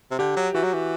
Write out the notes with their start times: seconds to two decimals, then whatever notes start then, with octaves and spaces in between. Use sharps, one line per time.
0.11 C3
0.19 D3 G4
0.36 F#3
0.54 E3 F#4
0.64 F#3
0.73 E3